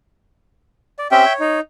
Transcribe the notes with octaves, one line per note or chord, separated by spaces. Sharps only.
D5
C4 C#4 G4 E5 G5
C#5
D#4